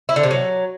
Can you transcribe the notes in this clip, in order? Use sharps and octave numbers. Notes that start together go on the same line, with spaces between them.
E4
D3
C3
F#3